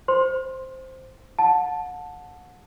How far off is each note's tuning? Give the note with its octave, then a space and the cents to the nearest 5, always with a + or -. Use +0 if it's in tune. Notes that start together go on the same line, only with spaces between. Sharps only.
C5 +0 C6 +10
F#5 -30 A5 +0